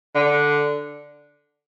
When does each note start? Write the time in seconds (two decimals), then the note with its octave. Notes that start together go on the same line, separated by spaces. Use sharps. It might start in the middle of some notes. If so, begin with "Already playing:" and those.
0.15 D3